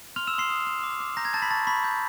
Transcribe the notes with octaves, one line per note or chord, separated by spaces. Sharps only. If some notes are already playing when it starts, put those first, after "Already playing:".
C6 F6 F7
E6 E7
D#6
C6 C7
D#6
C6
D6
D6
A#5 G6 A#6
G#6
A5 G6 A6
B5 B6
A5 C#6 A6
B5 C#6 B6
G6